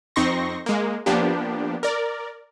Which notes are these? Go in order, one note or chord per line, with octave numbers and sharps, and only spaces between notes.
F2 C4 D#4 C6 C#6 A#6
G#3 A#3
F3 A#3 B3 D4 G4
A#4 D5